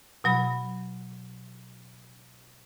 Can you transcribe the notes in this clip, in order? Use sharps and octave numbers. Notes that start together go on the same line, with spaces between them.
B2 F#3 B5